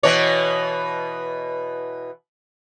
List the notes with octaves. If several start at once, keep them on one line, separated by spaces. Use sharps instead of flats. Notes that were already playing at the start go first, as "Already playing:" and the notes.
B2 E3 C#5